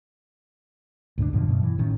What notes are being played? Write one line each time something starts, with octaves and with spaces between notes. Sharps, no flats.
D2 G#2 B3 D4
F#2 B2 D3 F3
F#2 B2
E3
A1 A2 D#3 C#4